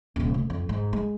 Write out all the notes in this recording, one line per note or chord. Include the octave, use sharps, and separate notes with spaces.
D#1 C3
D2
F2
G#2
G#3